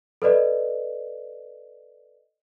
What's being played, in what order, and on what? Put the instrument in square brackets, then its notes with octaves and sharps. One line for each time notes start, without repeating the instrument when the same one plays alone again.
[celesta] A4 B4 D5 D#5